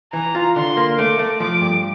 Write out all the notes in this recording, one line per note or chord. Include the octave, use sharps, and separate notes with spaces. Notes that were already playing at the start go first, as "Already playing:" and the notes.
E3 A#5
F4
D3 C6
A#3
A3 D6
A3
F3 D6
G2